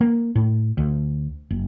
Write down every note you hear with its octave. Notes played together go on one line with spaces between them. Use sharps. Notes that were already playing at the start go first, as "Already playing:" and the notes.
A#3
A2
D2
F#1